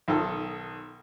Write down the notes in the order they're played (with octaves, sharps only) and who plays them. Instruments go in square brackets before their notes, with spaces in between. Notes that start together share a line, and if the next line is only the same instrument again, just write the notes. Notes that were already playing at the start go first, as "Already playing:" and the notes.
[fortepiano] B1 D#3 A4